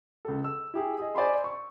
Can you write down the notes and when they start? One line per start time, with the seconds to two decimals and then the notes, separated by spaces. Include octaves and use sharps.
0.25 C#2 A4
0.44 E6
0.74 E4 G4 G#4
0.98 G#4 D#5
1.15 C5 D5 G#5 B5 C6
1.44 C#6